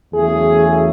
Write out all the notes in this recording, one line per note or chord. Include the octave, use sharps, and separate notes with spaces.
E2 C#3 F#3 A3 G#4